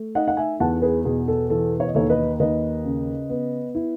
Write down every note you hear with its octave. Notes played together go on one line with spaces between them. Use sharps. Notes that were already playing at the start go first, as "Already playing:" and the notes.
Already playing: A3
D#4 D#5 F#5
F#5
E5 G#5
E2 F#5 A5
G#4 B4
B2 G#4
A4
E3 A4
C#5
D#5
D#2 A4 C#5
B4 D#5
D#2 B4 D#5
C#3
B3
E4